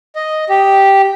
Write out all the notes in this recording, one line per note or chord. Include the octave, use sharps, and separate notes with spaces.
D#5
G4